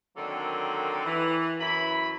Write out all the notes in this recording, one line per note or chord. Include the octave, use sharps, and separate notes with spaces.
D3 D#3 F#3 A#3 C4 A4
E3
F#2 E3 E4 B5